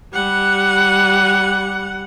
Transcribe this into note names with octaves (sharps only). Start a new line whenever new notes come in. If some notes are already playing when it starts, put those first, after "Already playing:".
G3 F#5